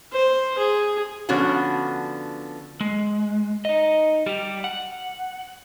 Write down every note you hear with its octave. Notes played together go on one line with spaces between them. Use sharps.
C5
G#4
D3 F3 B3 C#4 F#4 F#5
G#3
D#4 D#5
G3 G4
F#5